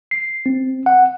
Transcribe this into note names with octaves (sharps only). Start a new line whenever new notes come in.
C7
C4
F#5